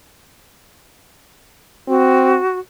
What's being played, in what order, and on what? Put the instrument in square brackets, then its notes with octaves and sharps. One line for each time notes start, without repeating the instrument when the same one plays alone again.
[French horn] C4 [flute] F#4